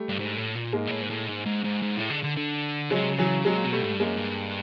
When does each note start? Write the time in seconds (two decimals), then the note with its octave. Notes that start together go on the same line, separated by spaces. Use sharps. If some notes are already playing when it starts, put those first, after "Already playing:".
Already playing: G3 A3
0.09 G2
0.19 G#2
0.37 A2
0.55 A#2
0.73 G#2 G#3 A#3
0.87 A#2
0.91 A2
1.01 G#2
1.10 A2
1.28 G#2
1.45 G#2
1.64 G#2
1.82 G#2
1.96 A2
2.10 D3
2.23 D3
2.37 D3
2.90 C#3 F#3 G#3
3.01 C3
3.10 C#3
3.18 E3 F#3
3.45 C3 F#3 G#3
3.57 A#2
3.64 B2
3.72 G3 A3
3.82 G#2
3.93 G2
4.00 G#3 A#3
4.05 F#2
4.17 G2